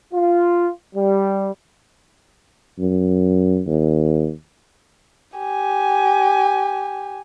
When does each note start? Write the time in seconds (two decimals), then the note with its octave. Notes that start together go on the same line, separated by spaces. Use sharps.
0.13 F4
0.95 G3
2.79 F#2
3.67 D#2
5.38 G4 G#5